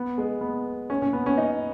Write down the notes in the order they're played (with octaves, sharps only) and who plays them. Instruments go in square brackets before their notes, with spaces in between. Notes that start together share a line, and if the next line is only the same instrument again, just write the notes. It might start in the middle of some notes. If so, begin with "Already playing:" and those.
Already playing: [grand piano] B3
G#3
B3
C#4
C#4
B3
C#4
D#4